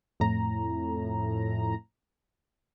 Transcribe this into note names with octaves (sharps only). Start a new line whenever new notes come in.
F2 A2 A#5